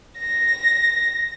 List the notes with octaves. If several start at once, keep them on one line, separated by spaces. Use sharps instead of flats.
A#6